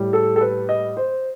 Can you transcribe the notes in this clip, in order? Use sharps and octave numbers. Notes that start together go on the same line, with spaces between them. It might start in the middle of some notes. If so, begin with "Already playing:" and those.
Already playing: A2 G3
A4
A4
B4
D#5
C5